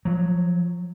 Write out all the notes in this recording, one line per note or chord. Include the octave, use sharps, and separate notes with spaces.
F3 F#3